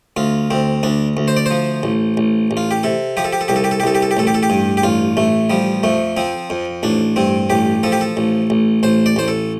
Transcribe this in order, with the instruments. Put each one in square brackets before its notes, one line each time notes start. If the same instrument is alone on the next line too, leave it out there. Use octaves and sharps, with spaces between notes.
[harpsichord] D2 F4
D2 C4
D2 D4
D2
C5
D5
F3 C5
A1
A1
A1
F4
G4
C3 A4
F3 G4
A4
G4
A4
C2 G4
A4
G4
A4
G4
C2 A4
G4
A4
G4
A1 A4
G4
A4
G4
G2
G4
A1 F4
A1 A3
F3 G3
F2 A3
F3 C4
F2
A1 D4
G2 C4
A1 G4
F3 A4
G4
A4
A1
A1
A1 C5
D5
A1 C5
A4